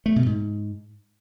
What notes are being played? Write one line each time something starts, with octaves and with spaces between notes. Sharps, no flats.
A3
B2
G#2